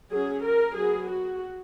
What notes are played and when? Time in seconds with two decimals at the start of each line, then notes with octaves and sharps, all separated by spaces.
0.11 F#3 C#4 G#4
0.43 A#4
0.75 F#3 B3 G#4
1.08 F#4